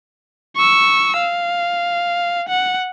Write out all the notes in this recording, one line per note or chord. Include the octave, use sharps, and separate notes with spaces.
C#6 E6
F5
F#5